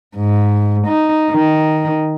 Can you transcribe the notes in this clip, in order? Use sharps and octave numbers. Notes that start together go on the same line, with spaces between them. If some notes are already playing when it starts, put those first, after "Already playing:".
G#2
D#4
D#3